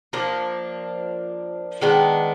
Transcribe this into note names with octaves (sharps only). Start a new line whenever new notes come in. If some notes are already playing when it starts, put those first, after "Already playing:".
F3 A#3 D4
D#3 G#3 B3 D4